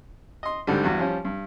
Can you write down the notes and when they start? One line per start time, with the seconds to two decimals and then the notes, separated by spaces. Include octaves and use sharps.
0.43 D#5 C6
0.67 D2 G#2 D3 G3
0.84 E2 G2 F#4
0.99 F3 G3 C#4
1.25 G2